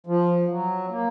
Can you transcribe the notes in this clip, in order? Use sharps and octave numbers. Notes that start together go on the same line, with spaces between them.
F3
F#3
A#3